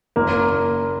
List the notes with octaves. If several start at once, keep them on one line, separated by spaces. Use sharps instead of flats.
F#1 A#3